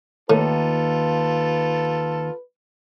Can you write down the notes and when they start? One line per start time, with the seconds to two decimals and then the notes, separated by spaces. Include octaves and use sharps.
0.30 D#2 A2 D#4 F4 G4 A4 B4